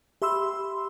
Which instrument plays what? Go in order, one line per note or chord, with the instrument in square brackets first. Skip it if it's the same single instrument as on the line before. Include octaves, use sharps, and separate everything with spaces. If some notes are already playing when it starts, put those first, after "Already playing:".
[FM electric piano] G4 E5 B5 C6 E6